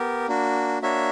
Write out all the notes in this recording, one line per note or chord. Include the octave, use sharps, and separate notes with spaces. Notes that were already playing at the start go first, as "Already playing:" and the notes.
Already playing: B3 G4 A#4
A#3 D4 F#4
A#3 D4 F#4 C#5 E5